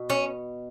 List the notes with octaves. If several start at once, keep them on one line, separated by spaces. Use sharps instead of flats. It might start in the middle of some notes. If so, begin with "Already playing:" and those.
Already playing: B2
C#4